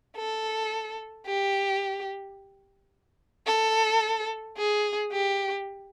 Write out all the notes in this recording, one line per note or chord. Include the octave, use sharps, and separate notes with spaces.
A4
G4
A4
G#4
G4